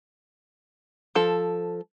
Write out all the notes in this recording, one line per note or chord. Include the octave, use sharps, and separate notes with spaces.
F3 A4